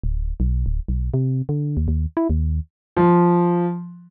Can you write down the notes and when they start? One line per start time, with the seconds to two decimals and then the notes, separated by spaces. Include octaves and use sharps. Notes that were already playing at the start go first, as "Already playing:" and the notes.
0.03 D1
0.40 B1
0.66 D1
0.88 B1
1.14 C3
1.49 D3
1.77 D#2
1.88 D#2
2.17 E4
2.30 D#2
2.97 F3